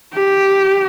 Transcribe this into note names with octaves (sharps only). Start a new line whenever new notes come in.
G4